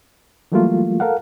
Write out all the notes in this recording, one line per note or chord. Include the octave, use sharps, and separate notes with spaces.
E3 F#3 G3 A3 A#3 F4
A4 A#4 F5 F#5